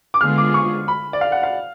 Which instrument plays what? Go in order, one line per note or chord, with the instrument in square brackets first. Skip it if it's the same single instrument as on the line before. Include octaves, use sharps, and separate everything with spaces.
[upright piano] D6
[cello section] D3 G#3 B3 F4 G#4 [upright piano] F6
[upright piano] D6
C#6
B5
D5
F5
F#5
F5